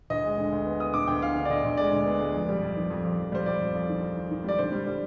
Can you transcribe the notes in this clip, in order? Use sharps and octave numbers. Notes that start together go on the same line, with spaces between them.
D2 D#5
G#3
D3
D2
B3
B3 D#6
D3 D6
D2 G5
D3 F5
D3
D5
D3 D#5
D2
G#3 D5
D3
B3
G#3
F2
G3
F2
D#3
F2
F2
F2
G3 C5
G3 D5
F2
F2
D#3
D#3
D#3
D#3
G3 D5
D3 C5
G3
G3